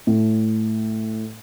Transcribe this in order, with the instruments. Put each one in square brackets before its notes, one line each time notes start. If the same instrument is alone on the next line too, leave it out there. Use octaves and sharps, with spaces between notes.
[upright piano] A2